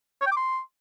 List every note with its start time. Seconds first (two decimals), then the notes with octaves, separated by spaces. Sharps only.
0.21 C#5
0.26 G5
0.32 D6
0.37 C6